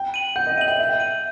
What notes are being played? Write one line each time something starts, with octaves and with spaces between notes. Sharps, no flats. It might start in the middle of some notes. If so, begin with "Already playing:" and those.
Already playing: G5
D#7 F#7
F#5 G6
D#5
E5 D#7 F#7
G5
E5 G6
D#7 F#7